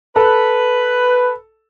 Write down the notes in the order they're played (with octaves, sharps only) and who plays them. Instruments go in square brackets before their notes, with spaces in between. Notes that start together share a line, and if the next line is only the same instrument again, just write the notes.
[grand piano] A4 [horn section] B4